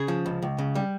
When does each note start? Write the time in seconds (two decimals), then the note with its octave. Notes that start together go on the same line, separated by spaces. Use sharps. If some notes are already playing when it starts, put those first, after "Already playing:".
Already playing: C#3 G#4
0.08 F3
0.26 C#2
0.42 C#2
0.58 C#3
0.75 G3